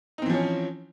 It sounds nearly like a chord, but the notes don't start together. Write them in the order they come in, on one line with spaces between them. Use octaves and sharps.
D#4 C4 E3 F3 C#4